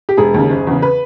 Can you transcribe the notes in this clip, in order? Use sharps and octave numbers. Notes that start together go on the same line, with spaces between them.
G4
E1 G#4
D#2 C#3
F#1
E2 C#3
B4